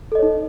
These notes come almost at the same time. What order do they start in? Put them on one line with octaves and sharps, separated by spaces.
A4 D#5 C#5 D#4